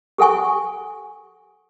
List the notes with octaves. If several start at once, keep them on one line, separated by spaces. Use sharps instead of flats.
G4 A4 F#5 G#5 C#6